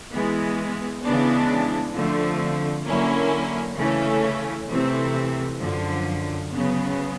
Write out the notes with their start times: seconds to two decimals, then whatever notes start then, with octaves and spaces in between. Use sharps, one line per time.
0.11 E3 G#3 B3
1.03 C#3 E3 G#3 B3 D4
1.94 D3 F3 A3 C4
2.86 D3 F#3 A#3 C#4 E4
3.77 C#3 E3 A3 C#4
4.69 C3 E3 A3 C4
5.60 F#2 D3 F3
6.52 C#3 F#3 B3